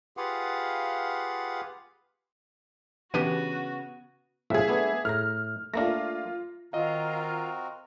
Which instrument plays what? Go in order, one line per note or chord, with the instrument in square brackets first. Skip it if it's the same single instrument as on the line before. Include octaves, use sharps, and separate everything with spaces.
[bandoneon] F4 G4 G#4 B4 F5 F#5
[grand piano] C#3 B3 D#7 [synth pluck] E3 D4 G4 [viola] F#4
[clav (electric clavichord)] C2 A2 F3 [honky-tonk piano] G#4 E5
[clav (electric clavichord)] A3 B3 D4
[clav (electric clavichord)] A2 A#5 [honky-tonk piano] F6
[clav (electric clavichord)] A3 A#3 D4 [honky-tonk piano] F4 A#6
[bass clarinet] D#3 [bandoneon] C4 F#4 A#4 [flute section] F4 A#5 [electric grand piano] D#5 F5